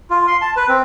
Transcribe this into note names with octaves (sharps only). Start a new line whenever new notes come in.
F4
C6
A5
B4
C4